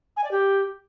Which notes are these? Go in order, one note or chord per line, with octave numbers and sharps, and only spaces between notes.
G#5
D5
G4